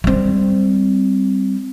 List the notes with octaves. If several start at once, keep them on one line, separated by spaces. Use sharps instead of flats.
G3 C4